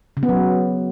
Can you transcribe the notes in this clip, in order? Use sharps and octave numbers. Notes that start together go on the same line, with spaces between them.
C#3
B3
F#3